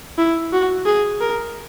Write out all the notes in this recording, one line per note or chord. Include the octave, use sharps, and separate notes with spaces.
E4
F#4
G#4
A#4